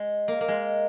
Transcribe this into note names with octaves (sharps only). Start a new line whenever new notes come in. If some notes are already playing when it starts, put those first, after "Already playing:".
Already playing: G#3
A#3
A#3
G#3